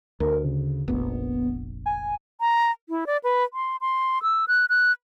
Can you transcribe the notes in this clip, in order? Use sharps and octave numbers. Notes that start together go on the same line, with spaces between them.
D2 A#4
C#3
F1 A#1 B3
G#5
A#5
E4
D5
B4
C6
C6
E6
F#6
F#6